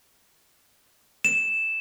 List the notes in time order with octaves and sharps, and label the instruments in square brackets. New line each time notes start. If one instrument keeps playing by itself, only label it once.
[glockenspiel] E7